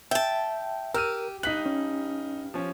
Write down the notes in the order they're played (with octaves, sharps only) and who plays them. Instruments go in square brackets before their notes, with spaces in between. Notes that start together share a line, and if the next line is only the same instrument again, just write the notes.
[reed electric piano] E5 [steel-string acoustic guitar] G5 A5
[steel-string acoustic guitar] G4 [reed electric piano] A#4 [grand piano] E6 F6 D#7
[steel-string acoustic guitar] G2 [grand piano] D#4 B6 F#7 [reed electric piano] F#6
[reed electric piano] C#4
[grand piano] F3 C#4